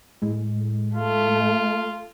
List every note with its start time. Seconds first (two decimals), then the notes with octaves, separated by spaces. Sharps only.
0.22 A2 G#3
0.96 A3 F4